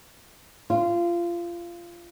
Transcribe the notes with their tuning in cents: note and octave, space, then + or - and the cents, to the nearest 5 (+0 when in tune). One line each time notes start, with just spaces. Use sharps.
F4 -20